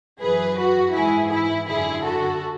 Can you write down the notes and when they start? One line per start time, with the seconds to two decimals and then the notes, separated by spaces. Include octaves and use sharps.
0.21 F#2 E3 G#4 B4
0.58 F#4
0.94 G#2 E3 E4 G#4
1.31 E4
1.67 F#2 D3 E4 G#4
2.03 F#4 A4